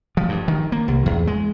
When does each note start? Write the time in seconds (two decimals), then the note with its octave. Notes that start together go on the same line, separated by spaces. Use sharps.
0.17 F3
0.29 G2
0.48 D#3
0.72 A#3
0.88 C2
1.06 E2
1.27 G#3